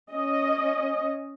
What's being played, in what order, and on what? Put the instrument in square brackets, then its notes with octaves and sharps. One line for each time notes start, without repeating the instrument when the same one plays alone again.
[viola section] C#4 D#5